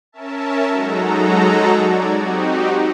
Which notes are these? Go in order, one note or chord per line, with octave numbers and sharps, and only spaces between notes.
C#4 A#4 E5 A5
F#3 G#3 D#4 F#4 A4 A#5
D5 G#6
C4 D#4 F#4 G4